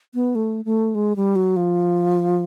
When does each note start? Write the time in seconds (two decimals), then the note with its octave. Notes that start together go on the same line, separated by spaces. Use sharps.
0.14 B3
0.35 A3
0.65 A3
0.95 G#3
1.16 G3
1.36 F#3
1.56 F3